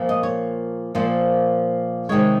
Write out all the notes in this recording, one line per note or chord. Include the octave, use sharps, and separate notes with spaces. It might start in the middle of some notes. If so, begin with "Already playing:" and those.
Already playing: A#2 F3 A#3
D#5
C#5
A#2 F3 A#3 C5
C3 D#3 G#3 C#5